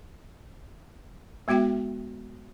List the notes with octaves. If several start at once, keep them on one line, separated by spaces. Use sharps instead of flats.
G#3 B3 F#4 E5 G5